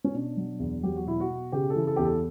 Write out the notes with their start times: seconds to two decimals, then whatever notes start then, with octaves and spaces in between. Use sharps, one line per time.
0.04 C#4
0.14 B2 D4
0.37 F#3
0.60 E2
0.83 F#3 G4
0.96 F#4
1.07 B2 E4
1.20 F#4
1.29 B2
1.52 C#3 G4
1.70 A4
1.76 E3
1.87 A4
1.96 E2 G4
2.05 A4